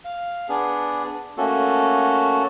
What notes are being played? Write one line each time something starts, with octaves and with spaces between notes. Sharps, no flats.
F5
B3 D4 G#4
A3 A#3 C#4 F#4 A4